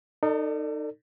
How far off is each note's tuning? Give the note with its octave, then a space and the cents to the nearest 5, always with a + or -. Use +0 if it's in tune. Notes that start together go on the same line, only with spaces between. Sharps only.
D#4 -20 A4 +35 D5 +10